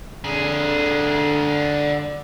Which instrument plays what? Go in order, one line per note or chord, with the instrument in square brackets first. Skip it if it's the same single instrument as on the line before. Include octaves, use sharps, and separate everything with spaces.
[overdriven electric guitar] D3 G#4